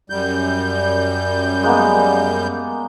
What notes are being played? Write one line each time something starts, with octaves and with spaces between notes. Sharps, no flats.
F#2 G3 G6
G#3 A#3 B3